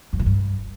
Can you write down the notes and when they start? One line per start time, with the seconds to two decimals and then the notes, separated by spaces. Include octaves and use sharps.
0.13 F#2
0.19 B2
0.26 G2